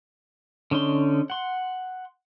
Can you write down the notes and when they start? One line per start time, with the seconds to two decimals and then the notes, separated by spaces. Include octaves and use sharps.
0.71 D3 C#4 D#4 C6
1.30 F#5 C6